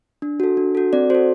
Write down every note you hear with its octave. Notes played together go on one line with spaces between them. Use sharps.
D4
F#4 A4
D4
F#4 A4
C4 D5
F#4 A4 C5